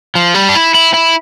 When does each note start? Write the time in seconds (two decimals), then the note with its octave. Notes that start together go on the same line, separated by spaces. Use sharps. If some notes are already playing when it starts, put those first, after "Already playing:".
0.15 F3
0.34 G3
0.49 D4
0.55 E4
0.74 E4
0.94 E4